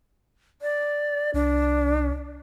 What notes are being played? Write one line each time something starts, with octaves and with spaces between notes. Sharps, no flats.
D5
C2 D4